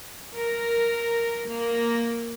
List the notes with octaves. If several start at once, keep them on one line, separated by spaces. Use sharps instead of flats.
A#4
A#3